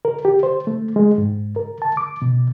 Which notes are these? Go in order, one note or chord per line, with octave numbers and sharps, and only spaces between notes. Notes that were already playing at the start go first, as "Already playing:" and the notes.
A#4
G4
C5
A3
G#3
G#2
A#4
A5
D6
B2